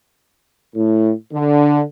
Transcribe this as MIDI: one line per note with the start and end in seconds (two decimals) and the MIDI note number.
0.76 1.11 45
1.32 1.82 50